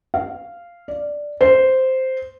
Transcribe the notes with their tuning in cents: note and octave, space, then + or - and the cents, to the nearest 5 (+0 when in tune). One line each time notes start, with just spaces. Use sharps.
F5 -10
D5 +0
C5 -5